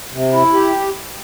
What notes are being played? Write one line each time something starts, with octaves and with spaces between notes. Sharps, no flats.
C3
E4
G4